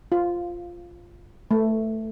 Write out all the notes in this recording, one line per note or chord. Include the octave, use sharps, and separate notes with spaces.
F4
A3